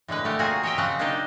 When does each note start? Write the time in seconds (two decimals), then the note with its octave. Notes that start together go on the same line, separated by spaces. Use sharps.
0.08 A2 D3 G#3 B4
0.25 A3 G4 A#4
0.39 A#2 A#3 C4 F#4 G#4 G#5
0.63 C#5 D#5 E5 G5
0.78 C#3 F#3 C4 F#5
0.99 A#3 D4 D#4 G4